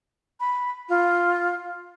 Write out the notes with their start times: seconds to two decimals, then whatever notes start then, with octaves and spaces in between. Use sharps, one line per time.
0.40 B5
0.89 F4